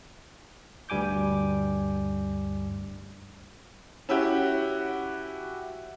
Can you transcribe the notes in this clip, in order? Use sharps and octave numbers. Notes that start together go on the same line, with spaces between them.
D2 G2 G3 G#5 D6 G6
C#4 E4 F#4 G4